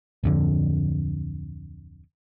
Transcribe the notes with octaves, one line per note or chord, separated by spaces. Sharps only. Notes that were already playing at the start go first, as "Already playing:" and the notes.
D1 F2 D3